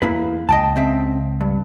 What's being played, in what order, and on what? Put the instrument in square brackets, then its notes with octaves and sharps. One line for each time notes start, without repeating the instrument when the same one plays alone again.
[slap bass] E2 [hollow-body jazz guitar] A#3 E4 B4
[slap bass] C#2 [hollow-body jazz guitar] D#5 G5 A5
[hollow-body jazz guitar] C#3 C4 E5
G2